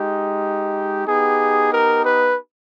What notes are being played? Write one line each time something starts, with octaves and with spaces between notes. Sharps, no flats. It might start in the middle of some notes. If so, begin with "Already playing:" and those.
Already playing: G#3 D#4 G4
B3 D#4 G4 G#4
A#4
B4